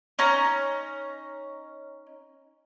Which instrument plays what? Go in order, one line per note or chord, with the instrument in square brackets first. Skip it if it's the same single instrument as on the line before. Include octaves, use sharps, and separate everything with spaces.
[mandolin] C#4 D#4 A#5